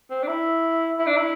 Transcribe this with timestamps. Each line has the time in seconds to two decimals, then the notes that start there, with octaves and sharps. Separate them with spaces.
0.10 C4
0.23 D4
0.27 E4
0.99 E4
1.07 D4
1.17 E4